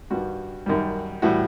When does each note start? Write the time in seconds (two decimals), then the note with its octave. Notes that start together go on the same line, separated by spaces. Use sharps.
0.10 G2 D#3 G3 F#4
0.66 F#2 D#3 G3
1.22 A2 E3 G3 F#4